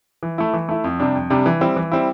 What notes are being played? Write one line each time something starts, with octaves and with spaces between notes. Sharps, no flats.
E3
A3 E4
E3
A3 E4
F2
C3 G3 D4
F2
C3 G3 D4
E3
G3 C4 E4
E3
G3 C4 E4